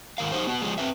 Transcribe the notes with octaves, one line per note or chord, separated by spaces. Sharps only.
G#2 D#3 A#4 F5
F#3 D#4 G4 C5
B3 F#4
F3 G#3
C4 C#4 B4 E5